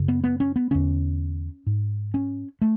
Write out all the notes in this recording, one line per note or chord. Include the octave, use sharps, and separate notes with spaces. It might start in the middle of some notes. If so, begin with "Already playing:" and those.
Already playing: F#2 C#3
B3
B3
C#4
B3
E2 D3 C#4
G#2
C#4
A3